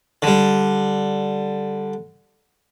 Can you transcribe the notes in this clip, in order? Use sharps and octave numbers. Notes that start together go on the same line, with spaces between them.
D3 G3